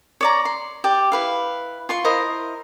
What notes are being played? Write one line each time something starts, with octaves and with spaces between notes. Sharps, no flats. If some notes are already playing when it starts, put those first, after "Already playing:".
C#5 D5 A#5
C6
G4 D5
E4 B4 F5
F4 C6 C#6
E4 A#4 C5 D#5